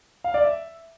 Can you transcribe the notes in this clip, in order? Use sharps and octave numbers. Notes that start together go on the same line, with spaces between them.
F5
D5
E5